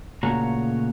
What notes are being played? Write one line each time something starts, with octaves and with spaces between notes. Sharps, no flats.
A#2 C#3 A3 F#4 C#5 A#5